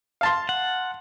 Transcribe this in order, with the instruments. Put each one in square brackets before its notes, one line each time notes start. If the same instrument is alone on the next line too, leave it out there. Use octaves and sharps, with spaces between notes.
[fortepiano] F5 A5 C6
[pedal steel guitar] F#5